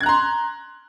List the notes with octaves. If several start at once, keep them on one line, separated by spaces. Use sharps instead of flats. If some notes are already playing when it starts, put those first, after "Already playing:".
A#5 C6 F#6 G#6